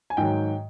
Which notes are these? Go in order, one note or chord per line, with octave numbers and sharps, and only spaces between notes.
G#5
G#2 D#3 F#3 G5